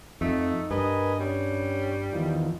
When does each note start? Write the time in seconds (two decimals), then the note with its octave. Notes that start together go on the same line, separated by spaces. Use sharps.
0.21 F2 A3 D#4
0.71 G2 A#4 B4 D#5 G#5
1.20 G3 C#4
2.13 E2 D#3 F3